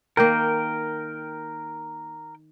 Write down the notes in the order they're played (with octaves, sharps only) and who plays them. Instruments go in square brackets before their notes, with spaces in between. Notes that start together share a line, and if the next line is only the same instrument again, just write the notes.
[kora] D#3 A#3 [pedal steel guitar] A#4 G5